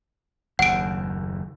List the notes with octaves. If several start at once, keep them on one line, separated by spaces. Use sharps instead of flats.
F#1 D#2 F#5 D7